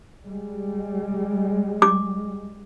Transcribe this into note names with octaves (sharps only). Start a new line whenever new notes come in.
G3 G#3
D6